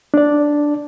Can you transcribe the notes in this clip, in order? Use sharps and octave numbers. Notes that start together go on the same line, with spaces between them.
D4 D5